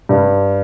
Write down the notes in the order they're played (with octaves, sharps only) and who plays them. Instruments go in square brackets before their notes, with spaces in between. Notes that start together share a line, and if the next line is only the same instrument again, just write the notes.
[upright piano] G2